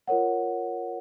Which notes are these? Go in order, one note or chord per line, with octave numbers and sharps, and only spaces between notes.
F4 A#4 C#5 F#5